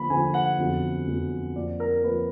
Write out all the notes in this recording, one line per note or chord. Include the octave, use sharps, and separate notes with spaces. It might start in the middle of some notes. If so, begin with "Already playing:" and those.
Already playing: D3 F3 A#3 B5
D3 F3 A#3 G#5
F#5
F2 D3 F#3 B3
F2 D3 F#3 B3
F2 F3 A#3 D5
A#4
F3 A#3 B4